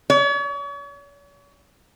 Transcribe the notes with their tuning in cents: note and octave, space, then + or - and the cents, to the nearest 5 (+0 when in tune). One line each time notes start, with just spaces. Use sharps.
C#5 +40